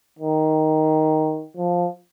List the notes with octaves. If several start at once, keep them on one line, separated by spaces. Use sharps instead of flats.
D#3
F3